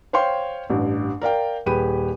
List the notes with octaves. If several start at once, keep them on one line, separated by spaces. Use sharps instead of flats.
C5 C#5 F5 G5 C6
A1 G2
A#4 D5 F5 G5
D#1 G4 G#4 B4 B5 D#7